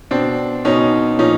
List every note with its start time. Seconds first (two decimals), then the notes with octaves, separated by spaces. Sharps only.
0.11 B2 C4 D4
0.65 B2 C#4 D#4
1.19 A#2 F3 C#4 D#4